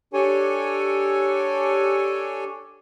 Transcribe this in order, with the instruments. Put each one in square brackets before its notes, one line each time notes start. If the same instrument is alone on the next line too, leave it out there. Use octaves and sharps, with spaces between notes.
[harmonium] D4 G4 A4 C#5 G#5